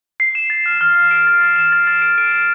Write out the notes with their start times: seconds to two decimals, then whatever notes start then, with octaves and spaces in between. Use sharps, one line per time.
0.20 C7
0.35 E7
0.50 A6
0.66 F6
0.81 F6
0.95 F6
1.11 D7
1.27 A6
1.41 A6
1.56 E7
1.72 A6
1.87 A6
2.02 D7
2.18 D7
2.32 D7